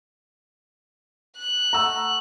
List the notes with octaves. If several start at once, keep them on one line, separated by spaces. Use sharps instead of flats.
F#6
A3 F#5 A#5 E6